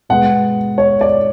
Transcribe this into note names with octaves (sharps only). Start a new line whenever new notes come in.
B2 G#3 B3 F#5
C#5
D5